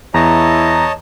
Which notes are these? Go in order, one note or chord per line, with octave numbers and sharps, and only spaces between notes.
E2 E4 C#5 D#5 A5 A#5